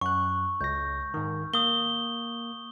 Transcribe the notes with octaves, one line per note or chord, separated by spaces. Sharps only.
F#2 C#6 F#6
C#2 G6 A#6
G#2 D#3
A#3 D#6 G7